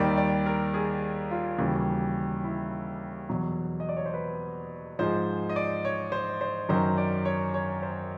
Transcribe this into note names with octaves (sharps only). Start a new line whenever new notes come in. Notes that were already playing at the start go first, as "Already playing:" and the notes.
Already playing: D#2 D#3 G3 D5
D5
A#4
G#4
F4
D#2 C#3 E3 G3 F#4
E4
E2 B2 F#3
D#5
D5
C#5
C5
B4
G#2 F3 G#3 C5
D#5
D5
C#5
C5
C5
F#2 D#3 F#3 C5
D5
C#5
C#5
C5